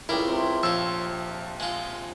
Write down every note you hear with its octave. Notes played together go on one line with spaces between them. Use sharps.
C#2 G3 E4 A#4 F5 G5
C3 C4
A#1 F3 F4 C#5 E6
G#3 F4